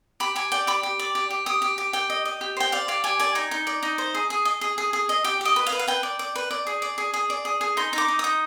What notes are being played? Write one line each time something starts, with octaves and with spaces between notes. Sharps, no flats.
G4 B5
G4 G#5
D5 G5
G4 B5
G4
D5
G4
G4
G4 D#6
G4
G4
G4 G5
D#5
D#5
G4
C5 G5
D5 F5
G4 F5
G4 G#5
D5 G#5
D#4 G#5
D#4
D5
D#4
C5
G#4
G#4
D#5
G#4
G#4
G#4
D#5
G4 G5
G4 D#5
B4
F5
B4
F5
B4 G5
D5
D5
B4
D5
G#4
D5
G#4
G#4
D5
G#4
G#4
D#4 C6
D#4 D6
D#4
D#4 D#6